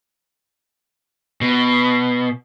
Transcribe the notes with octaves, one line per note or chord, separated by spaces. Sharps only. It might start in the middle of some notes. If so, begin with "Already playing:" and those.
B2